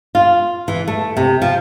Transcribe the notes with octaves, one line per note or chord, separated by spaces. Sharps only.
F4
E3
A3
C3
F3